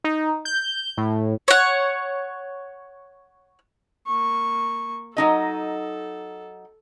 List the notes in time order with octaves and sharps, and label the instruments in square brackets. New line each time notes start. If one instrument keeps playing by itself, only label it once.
[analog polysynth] D#4
G6
A2
[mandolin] C#5 F#5
[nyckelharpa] A#3 C#6
[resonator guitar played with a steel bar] F#3 D#4 D#5 [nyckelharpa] A4